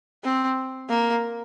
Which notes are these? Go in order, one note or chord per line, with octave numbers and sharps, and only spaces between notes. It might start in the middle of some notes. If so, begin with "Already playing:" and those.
C4
A#3